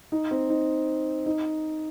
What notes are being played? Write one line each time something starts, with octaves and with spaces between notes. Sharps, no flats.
D#4
C4
D#4
D#4